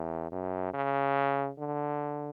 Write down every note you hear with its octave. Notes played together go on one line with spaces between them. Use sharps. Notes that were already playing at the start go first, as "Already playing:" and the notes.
Already playing: E2
F#2
C#3
D3